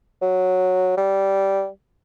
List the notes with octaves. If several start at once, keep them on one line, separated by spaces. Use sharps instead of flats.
F#3
G3